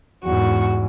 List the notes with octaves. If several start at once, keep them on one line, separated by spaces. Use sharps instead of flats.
E2 G#2 F#4